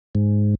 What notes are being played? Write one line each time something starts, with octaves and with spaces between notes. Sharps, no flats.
G#2